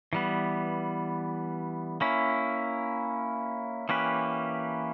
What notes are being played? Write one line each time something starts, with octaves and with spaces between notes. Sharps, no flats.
E3 G3 B3
A#3 C#4 E4
E3 A#3 C#4 G4 B4